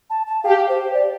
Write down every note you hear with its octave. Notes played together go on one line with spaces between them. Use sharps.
A5
A5
G4 F5
C5
D5